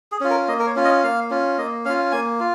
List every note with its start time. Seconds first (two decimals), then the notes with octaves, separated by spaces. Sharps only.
0.12 G#4
0.21 C#4 F4
0.30 A#4
0.48 A#3 D#5
0.60 A#4
0.66 C#5
0.76 C#4 F4
0.85 D#5
1.03 A#3 F5
1.30 C#4 F4
1.58 A#3 D#5
1.85 C#4 F4 F5
2.12 A#3 G#5
2.40 F4